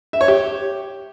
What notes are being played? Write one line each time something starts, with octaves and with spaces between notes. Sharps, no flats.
E5
C#5
G4